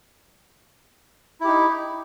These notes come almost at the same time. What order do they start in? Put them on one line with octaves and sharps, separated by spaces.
E4 G4 D#4